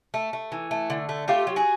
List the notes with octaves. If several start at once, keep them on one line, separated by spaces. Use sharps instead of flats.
A3
A3
E3
A3
D3
A3
A3 F4 G4
F#3
F#4 G#4